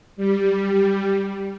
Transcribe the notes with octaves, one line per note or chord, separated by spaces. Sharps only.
G3